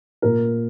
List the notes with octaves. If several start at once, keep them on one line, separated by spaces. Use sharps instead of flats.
A#2 A#4